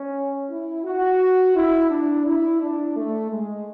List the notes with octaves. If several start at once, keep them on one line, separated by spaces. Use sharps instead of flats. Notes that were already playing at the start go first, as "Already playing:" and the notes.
Already playing: C#4
E4
F#4
E4
D4
E4
D4
A3
G#3